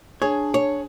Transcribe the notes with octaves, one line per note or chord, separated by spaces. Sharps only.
D4 G#4 C#5
C#5